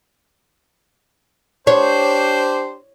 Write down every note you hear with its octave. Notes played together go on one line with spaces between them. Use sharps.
D4 G4 C5 C#5